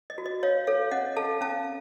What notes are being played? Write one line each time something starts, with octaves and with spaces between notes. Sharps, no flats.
D#5
F#4
D#5
C#5 F5
A4 C#5 F5
C#4 D#5 F#5
A4 F5 A5
C#4 F5 A5